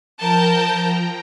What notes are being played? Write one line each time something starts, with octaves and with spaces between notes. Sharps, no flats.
F3 A#4 G5 A5 A#5 G6